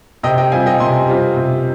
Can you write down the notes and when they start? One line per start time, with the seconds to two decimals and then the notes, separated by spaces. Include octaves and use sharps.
0.23 C3 D#5 G5
0.38 D#5 G5
0.52 G3 C4 F4 F5 G#5
0.66 D#5 G5
0.80 C3 G#5 C6
1.08 G3 C4 F4
1.36 C3